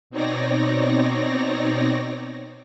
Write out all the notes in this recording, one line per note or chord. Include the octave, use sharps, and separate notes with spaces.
B2 C4 D#4 C#5 D5 A#6